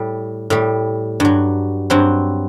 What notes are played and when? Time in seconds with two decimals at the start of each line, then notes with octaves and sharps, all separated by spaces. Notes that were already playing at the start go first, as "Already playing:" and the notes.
Already playing: A2 G3
0.50 A2 G3
1.20 G2 F#3
1.90 G2 F#3 C4